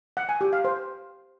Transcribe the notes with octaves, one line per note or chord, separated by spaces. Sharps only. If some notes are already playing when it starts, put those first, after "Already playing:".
F#5
G#5
G4
F5
C5